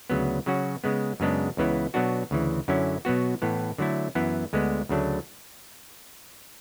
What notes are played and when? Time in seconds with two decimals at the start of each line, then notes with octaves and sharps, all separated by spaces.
0.10 D2 C#3 F#3 B3
0.46 C#3 F#3 C#4 F#4
0.84 C#3 G#3 B3
1.20 F#2 C#3 G#3 B3 D4
1.57 C#2 C#3 E3 B3 E4
1.94 B2 F#3 B3 D4 F#4
2.31 D2 C#3 E3
2.68 F#2 D3 F#3 C#4 E4
3.05 B2 F#3 B3 F#4
3.42 A2 E3 B3
3.78 D3 F#3 A3 E4
4.15 F#2 E3 B3 E4
4.53 D2 D3 G#3 B3
4.89 D2 C#3 F#3 A3 D4